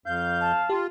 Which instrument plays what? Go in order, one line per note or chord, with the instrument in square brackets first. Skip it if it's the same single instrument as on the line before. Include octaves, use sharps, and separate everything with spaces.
[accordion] F2 G6 [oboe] F5
[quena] A5
[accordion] F4 [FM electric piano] G4